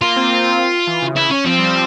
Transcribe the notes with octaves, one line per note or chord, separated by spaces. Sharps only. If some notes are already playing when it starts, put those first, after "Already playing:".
A#3 F4
C4
E3
C#3
C#3 E4
C#4
F3 C4
G3